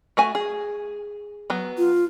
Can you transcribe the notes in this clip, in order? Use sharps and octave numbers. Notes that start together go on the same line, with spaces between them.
A3 F#4 G#5
G#4
F#3 B3
F4